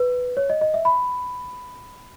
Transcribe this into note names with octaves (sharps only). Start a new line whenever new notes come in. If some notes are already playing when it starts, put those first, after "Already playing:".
Already playing: B4
C#5
D#5
D#5
E5
B5